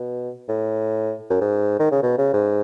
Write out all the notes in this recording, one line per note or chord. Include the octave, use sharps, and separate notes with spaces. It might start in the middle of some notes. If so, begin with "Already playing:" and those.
Already playing: B2
A2
F#2
G#2
D#3
C#3
B2
C#3
G#2